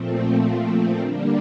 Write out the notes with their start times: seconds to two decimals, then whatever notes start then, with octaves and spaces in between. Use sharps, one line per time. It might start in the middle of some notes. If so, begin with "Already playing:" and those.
Already playing: A#2 F3 A3 C4
0.99 D3 G3 A#3 D4